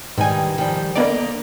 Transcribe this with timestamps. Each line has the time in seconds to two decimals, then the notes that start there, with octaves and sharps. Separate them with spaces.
0.18 G#2 D#3 E3 G3 G#5
0.58 D#3 F3 G3
0.95 D3 A#3 B3 D5 D#5 A#5